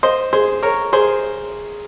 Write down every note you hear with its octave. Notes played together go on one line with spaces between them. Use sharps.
C5 D#5
G#4 C5
A#4 C#5
G#4 C5